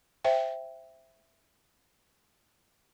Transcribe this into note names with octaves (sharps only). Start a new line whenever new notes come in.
C5 E5 G5